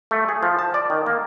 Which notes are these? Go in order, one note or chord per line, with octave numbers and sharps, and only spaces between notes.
A3
G#4
F3
A5
D5
D#3
A#3